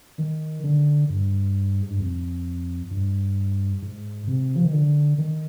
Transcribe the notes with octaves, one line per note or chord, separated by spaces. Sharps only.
D#3
D3
G2
G#2
G2
F2
G2
G#2
C3
F3
D#3
D3
D#3